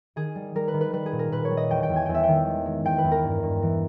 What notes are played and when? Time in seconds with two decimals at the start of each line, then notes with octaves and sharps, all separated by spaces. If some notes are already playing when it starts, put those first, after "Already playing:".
0.16 D#3 G#4
0.35 G3
0.55 G3 A#4
0.68 B4
0.74 D#3
0.81 B4
0.93 G3 B4
1.06 G#4
1.12 A#2
1.19 A#4
1.32 A#2 B4
1.45 C#5
1.51 G3
1.57 D#5
1.70 E2 G5
1.83 G5
1.89 E2
1.96 G#5
2.06 E2 G5
2.14 E5
2.23 D#3 G5
2.47 G#3
2.66 G#3
2.85 E2 G5
2.98 B4
3.05 E2
3.12 A#4
3.24 G2
3.43 G2
3.62 E3